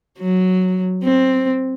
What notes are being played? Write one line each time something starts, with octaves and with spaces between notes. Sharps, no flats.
F#3
C4